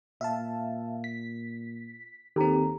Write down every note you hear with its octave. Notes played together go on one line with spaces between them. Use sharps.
A#2 E5 F5 A5
B6
D#2 D#3 C4 G4 A4 A#5